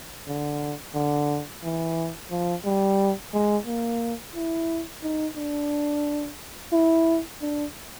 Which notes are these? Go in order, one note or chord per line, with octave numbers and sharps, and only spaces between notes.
D3
D3
E3
F3
G3
G#3
A#3
E4
D#4
D4
E4
D4